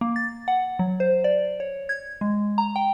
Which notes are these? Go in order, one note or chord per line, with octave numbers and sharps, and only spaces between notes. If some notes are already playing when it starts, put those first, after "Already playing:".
A#3
A6
F#5
F#3
C5
D5
C#5
G#6
G#3
A#5
G5